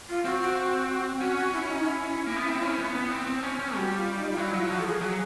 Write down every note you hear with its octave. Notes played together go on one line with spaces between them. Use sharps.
F4
C4 F#4
F#4
C#4 F#4
F#4
E4
E4
D#4
E4
A#3
B3
C4
C#4
B3
B3
C4
C4
C#4
C#4
G3 F#4
F4
D#4
F4
F#3 E4
F#3 F4
F3 F#4
A4
G#4
F#3 G#4